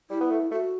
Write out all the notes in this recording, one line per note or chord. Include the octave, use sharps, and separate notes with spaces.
G3 E4
B3
A3
A3 F#4